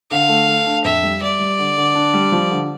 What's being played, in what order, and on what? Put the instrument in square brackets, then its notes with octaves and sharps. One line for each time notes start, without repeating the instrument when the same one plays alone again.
[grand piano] D3 [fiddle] F5
[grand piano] A3
A3
D4
[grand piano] F2 [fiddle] E5
[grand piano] G3
[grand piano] G3 [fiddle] D5
[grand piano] G3
D3
D3
D4
G3
F3
D3